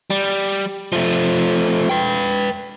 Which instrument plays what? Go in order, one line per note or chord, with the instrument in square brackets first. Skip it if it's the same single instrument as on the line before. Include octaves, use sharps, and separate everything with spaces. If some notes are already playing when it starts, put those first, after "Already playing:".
[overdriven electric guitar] G3
F3 A3
B4 G5